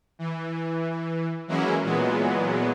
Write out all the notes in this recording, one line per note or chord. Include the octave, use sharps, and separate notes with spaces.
E3
E3 F#3 G#3 A#3 C#4 E4
A#2 E3 F#3 G#3 B3